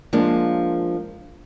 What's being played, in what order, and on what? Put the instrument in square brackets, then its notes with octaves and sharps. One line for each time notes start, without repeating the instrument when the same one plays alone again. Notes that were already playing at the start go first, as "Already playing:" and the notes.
[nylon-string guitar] F3 G#3 A#3 D4